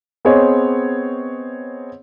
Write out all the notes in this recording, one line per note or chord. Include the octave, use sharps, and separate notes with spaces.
B3 C4 G#4 C5 C#5 D#5